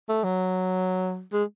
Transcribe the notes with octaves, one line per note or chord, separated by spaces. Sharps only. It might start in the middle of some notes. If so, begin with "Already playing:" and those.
A3
F#3
G#3